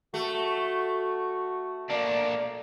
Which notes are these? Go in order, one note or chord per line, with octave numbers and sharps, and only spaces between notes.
A3 F#4
A#3 D4 D5